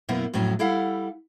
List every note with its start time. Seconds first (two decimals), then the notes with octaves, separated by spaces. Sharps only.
0.09 F#2 B2 A#3 B3 E4
0.33 F2 A2 F#3 C#4
0.59 G3 E4 A4 F5 F#5